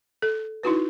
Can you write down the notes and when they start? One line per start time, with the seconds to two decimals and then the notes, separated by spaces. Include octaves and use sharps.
0.22 A4
0.63 D#4 E4 F#4 B4